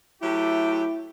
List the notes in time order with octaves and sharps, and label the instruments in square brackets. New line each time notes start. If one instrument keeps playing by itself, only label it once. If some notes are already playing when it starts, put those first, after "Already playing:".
[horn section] F#3 A3 G4 [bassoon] E4